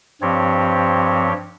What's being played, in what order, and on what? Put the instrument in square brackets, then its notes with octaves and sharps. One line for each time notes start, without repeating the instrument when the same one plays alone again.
[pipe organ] G2 F3 C4 G4 C#5